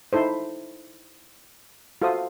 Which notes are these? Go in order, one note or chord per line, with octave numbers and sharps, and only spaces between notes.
D#4 E4 A4 C5
F4 F#4 A4 C5 E5 D#6